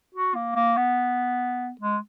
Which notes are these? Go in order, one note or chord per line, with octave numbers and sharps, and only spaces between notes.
F#4
A#3
A#3
B3
G#3